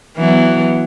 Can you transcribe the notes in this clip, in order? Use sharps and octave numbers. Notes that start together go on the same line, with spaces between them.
E3 F#3 B3